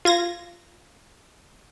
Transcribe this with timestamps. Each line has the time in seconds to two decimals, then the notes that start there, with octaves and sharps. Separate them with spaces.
0.05 F4 G#6 A#6